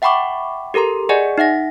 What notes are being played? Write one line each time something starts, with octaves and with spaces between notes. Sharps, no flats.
E5 F#5 G5 B5 C#6 D6
G4 A4 A#4 A#5 C6
G#4 D5 D#5 F#5 G#5
D#4 E5 F#5 A#6